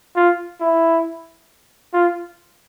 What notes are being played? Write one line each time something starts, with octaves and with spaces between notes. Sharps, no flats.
F4
E4
F4